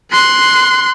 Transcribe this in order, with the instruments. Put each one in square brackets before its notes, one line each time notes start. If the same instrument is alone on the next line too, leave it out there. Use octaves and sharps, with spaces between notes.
[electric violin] C6 F#6